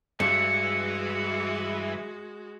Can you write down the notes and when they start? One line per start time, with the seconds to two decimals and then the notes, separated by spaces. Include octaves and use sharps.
0.20 G2 E3 G#3 F#4 C#7